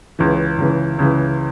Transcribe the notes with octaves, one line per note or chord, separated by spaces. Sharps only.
C#2 C#3 E3
C#2 C#3 E3
C#2 C#3 E3